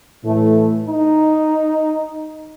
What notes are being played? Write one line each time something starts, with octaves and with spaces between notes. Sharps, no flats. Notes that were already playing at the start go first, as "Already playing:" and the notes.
A2 E3 A3
D#4